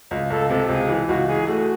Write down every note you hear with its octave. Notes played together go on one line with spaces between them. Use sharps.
C#2
C#2 A4
C3 A4
C#2 G#4
E3
C#2 F#4
E3 G#4
A3 F#4